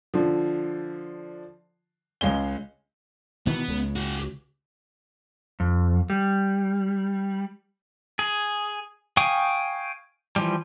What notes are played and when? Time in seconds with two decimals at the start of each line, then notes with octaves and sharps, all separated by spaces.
0.14 D3 F3
2.21 C#2 G#3 C#4 G7
3.47 B2 D#3 E3 B3
3.68 C#2 C#3
3.96 F#4 G#4
5.60 F2
6.10 G3
8.19 G#4
9.17 F5 G5 G#5 C#6 D#6
10.36 E3 F3 G3